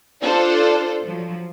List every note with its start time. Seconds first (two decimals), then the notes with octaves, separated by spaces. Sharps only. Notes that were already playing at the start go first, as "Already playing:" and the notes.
0.22 D4 F4 A4 C5 D5
1.03 F3 F#3